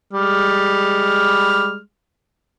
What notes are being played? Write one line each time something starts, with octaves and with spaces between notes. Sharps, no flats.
G3 G#3 F6